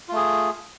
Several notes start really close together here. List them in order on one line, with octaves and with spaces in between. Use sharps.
F4 A3 G#4